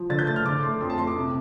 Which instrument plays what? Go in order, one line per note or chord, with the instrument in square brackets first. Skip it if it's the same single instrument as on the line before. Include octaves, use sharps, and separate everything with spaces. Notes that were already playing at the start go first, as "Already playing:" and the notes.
Already playing: [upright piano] F3
D3 A6
G6
A3 A6
F6
D3 D6
A3 C6
F2 C6
A5
A3 C6
D6
C3